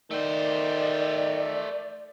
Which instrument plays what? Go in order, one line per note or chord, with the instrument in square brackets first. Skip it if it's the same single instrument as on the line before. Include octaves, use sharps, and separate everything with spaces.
[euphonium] D#3 [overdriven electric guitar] A3 C5 [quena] D5